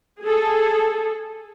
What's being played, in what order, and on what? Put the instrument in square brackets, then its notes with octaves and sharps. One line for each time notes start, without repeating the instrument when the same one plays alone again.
[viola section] G#4 A4